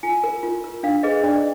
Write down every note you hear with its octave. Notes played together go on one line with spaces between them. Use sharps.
F4 G#5
A#4
F4
A#4
D4 F5
G#4 B4 D#5
D4 D5